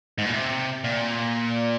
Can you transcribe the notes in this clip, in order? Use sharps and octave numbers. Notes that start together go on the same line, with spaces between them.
G#2
A#2
C3
A#2